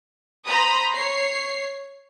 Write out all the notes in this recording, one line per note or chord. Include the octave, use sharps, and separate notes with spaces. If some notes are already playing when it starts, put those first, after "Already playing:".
C5 A#5 B5 D#6
C#5 C7